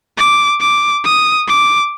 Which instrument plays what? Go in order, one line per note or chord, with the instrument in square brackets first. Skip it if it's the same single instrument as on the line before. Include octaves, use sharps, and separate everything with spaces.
[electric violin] D6
D6
D#6
D6